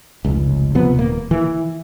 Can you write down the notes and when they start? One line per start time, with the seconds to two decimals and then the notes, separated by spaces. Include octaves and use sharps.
0.25 F1 C#2
0.75 C3 F3 B3
0.94 D#1 A#3
1.31 E3